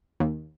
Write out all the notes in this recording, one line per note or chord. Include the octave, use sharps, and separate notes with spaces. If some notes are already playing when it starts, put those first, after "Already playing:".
D#2